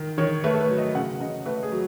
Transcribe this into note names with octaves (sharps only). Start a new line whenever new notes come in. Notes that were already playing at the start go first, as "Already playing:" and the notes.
Already playing: D#3
D#3 C#5
A3 B4
A4
B4
F#3
D#5
C#3 F#5
C#3 D#5
A3 B4
G#4
F#3